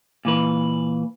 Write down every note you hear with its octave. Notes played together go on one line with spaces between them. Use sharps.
A#2 E3 B4